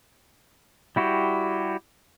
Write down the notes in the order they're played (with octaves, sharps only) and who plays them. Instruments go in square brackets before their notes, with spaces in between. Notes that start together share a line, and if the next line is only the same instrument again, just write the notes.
[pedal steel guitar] G3 E4 F#4 G4